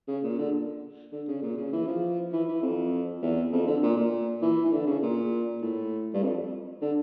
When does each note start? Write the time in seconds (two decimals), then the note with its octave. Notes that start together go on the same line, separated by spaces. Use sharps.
0.08 C#3
0.24 A#2
0.39 D3
1.12 D3
1.28 C#3
1.42 A#2
1.58 C#3
1.73 E3
1.87 F3
2.33 E3
2.48 E3
2.62 F2
3.22 E2
3.52 F2
3.67 D3
3.83 A#2
3.97 A#2
4.42 E3
4.65 E3
4.73 D3
4.87 C#3
5.03 A#2
5.62 A2
6.14 G2
6.23 F2
6.82 D3